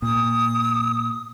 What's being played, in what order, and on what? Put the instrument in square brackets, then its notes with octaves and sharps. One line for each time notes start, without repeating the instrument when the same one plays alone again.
[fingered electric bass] A#2 [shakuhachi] D#6